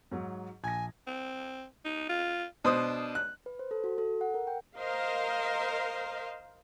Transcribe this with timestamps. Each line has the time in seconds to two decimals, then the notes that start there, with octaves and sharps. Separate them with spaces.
0.11 G#2 F#3
0.64 A#1 G#5 G#6 A#6
1.07 C4
1.85 D#4
2.09 F4
2.65 B2 D4 C5 D#6
3.15 F#6
3.46 B4
3.59 C5
3.71 A4
3.84 F#4
3.98 A4
4.21 F#5
4.34 A#4
4.47 G5
4.78 A#4 C5 D#5 F5